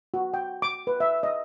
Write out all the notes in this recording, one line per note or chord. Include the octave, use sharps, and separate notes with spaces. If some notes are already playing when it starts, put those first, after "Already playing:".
F#4
G5
D6
B4
E5
D#5